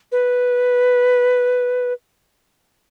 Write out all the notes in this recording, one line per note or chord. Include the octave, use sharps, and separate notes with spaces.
B4